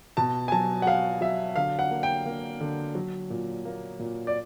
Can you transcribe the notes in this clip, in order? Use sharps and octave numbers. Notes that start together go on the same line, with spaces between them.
B2 A5
G#5
F#3 A5
F#5
F#3 F5
F#3 E5
D3 F5
F#5
A#3
G5
A#3
D3
F#3
A#2
A#3
A#2
D5